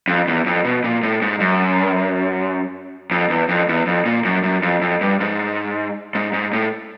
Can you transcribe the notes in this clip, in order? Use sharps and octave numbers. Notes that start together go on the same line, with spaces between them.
F2
E2
F2
B2
A#2
A2
G#2
F#2
F2
E2
F2
E2
F2
A#2
F#2
F#2
F2
F2
G2
G#2
G#2
G#2
A2